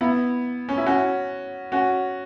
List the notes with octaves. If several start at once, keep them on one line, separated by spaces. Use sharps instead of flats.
B3 E4
C#4
E4
C#4 F#4
C#4 F#4